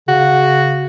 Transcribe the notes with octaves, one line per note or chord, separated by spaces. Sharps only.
C#3 F#4